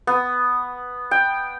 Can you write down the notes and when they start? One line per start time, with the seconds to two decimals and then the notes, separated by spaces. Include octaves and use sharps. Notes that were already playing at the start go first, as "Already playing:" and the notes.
0.07 B3
1.11 G5